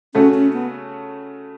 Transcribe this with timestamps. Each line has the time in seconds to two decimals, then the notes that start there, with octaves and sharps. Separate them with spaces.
0.14 C#3 A3 C#4 F#4 A4
0.34 C#4
0.53 B3